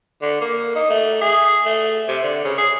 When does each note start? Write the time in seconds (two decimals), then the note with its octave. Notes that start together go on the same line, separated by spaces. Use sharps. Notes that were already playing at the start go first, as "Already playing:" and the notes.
0.22 D3
0.41 A#3
0.75 D#4
0.90 A3
1.21 G#4
1.65 A3
2.08 C3
2.24 D3
2.45 C#3
2.58 G#4